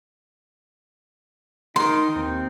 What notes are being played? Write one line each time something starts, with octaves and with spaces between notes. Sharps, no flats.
D#3 D#4 A#4 C6
D#2 C4